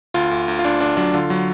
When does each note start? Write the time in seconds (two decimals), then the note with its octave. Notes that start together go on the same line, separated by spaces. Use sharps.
0.14 D2 F4
0.31 D2
0.48 D2
0.59 F4
0.64 D2 D4
0.80 D2 D4
0.97 F#3 D4
1.14 D3 F4
1.30 F#3